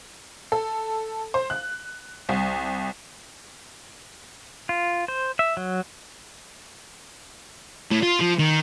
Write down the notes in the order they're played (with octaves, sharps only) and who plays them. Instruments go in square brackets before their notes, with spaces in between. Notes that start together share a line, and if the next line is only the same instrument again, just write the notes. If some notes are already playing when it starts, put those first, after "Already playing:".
[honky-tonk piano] A4
C5
F#6
C2
[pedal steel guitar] F4
C5
E5
F#3
[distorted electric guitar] A2
F4
F3
D#3